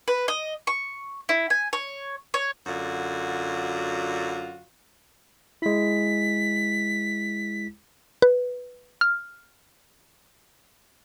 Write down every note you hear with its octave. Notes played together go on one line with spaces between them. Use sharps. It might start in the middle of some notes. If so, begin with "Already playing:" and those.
B4
D#5
C#6
E4
G#5
C#5
C#5
F#2 D3 F4 F#4
G#3 E4 B6
B4
F6